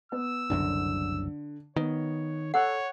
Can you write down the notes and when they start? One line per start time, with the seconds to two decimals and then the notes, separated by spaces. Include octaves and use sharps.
0.12 B3 E6
0.50 F#1 C2 F#2 D3
1.76 D#3 B3 C#5
2.54 A4 C#5 F#5 E6 F#6